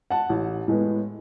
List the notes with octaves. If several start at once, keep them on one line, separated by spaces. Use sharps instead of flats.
F#5 A5
A1
A2 G#3 B3